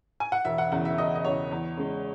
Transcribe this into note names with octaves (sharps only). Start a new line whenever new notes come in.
G#5
F#5
E1 E5
F#5
E2 C#3 F#5
E5
E1 D#5
D#5
E2 C#3 C#5
E2
C#3 G#3